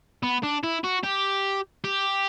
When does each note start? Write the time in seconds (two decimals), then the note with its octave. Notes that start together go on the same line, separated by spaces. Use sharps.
0.23 B3
0.43 D4
0.63 E4
0.84 F#4
1.03 G4
1.84 G4